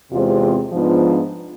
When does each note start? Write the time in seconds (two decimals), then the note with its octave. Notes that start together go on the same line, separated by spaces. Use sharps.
0.11 E2 C3 G#3 C4 F4
0.72 G#2 F3 B3 D4 F4